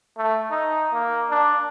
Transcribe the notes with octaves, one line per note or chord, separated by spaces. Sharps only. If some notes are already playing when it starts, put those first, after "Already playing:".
A3
D#4
A#3
D4